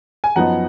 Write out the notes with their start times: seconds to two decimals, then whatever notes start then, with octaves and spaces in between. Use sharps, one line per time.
0.24 G#5
0.36 F#2 F3 B3 D#4 F#5 A#5